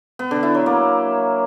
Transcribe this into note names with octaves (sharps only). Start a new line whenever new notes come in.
B3
D3
E4
F#3
A#3